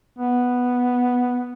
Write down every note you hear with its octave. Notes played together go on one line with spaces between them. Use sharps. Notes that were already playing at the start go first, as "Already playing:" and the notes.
B3